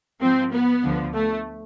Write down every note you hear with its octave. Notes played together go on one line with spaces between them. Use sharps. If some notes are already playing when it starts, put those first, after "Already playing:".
G#2 F3 C4
B3
D2 D3 F3
A3